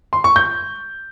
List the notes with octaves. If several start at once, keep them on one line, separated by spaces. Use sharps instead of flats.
C6
C#6
G6